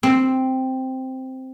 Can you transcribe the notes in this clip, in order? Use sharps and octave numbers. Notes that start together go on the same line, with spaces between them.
C4